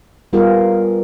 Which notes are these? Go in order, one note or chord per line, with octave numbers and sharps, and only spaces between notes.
G3 B3 F4 G#4 A#4